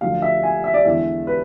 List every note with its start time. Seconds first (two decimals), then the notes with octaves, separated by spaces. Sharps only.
0.01 D2 D3 F3 F5
0.22 E5
0.43 G#5
0.64 E5
0.74 D5
0.84 E2 D3 G#3 E5
1.27 B4